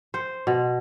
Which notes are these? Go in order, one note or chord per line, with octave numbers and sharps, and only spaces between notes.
C5
B2